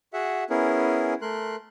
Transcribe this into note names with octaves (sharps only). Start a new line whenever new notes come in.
F#4 G#4 E5 F#5
B3 C#4 E4 G#4 A#4
A3 A#4 C6 F#6